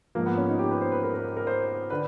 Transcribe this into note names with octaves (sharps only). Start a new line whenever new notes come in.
G#2 F3 A#3
B3
C#4
D#4
G4
B4
C5
B4
A#4
A#4
A#4
C5
D3 B4